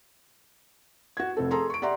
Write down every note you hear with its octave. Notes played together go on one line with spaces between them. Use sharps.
F#4 G#6
F1 C4 A4
G#4 A4 A#5 C6
C#6 D7
G4 D5 E5 F#5 A#5 C6